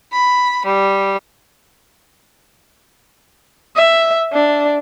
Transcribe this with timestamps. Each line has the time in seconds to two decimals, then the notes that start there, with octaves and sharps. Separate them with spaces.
0.11 B5
0.63 G3
3.76 E5
4.33 D4